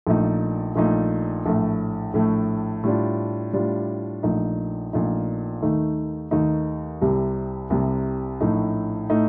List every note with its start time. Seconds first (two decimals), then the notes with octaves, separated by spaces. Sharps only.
0.07 A#1 A#2 A3 D#4
0.76 A#1 A#2 A3 D#4
1.46 A#1 A2 A3
2.14 A#1 A2 A3
2.83 A2 G3 D4 F4
3.53 A2 G3 D4 F4
4.23 A#1 A#2 A3 D#4
4.93 A#1 A#2 A3 D#4
5.62 D#2 D#3 A3 D#4
6.31 D#2 D#3 A3 D#4
7.01 C2 C3 G3
7.70 C2 C3 G3
8.41 A#1 A2 A3 D#4
9.10 A2 A3 D#4